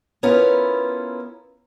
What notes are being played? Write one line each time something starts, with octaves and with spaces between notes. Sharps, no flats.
B3 C#4 E4 F4 A#4 B4